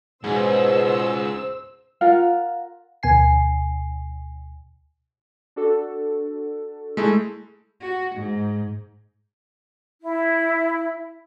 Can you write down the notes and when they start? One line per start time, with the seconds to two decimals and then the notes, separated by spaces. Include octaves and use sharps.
0.24 C#2 G#2 B2 C5 E6
2.01 F4 A#4 F5 F#5
3.03 D2 B2 G#5 C7
5.56 D4 F#4 A4
6.97 G#3 A3 E4
7.81 F#4
8.15 G#2
10.02 E4